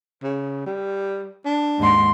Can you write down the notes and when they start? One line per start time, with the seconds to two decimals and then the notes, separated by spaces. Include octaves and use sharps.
0.23 C#3
0.66 G3
1.45 D4
1.77 D#2 G#2 C6